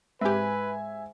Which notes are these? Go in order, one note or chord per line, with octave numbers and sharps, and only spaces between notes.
G#2 C4 G4 B4 E5 G#5